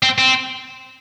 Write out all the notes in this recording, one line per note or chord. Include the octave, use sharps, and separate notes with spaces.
C4
C4